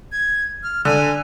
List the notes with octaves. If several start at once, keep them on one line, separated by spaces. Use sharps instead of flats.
G#6
F6
D3 G#5